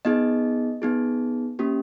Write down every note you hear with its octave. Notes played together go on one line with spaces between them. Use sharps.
B3 D#4 G#4 D#5
B3 D#4 G#4
A#3 C#4 G4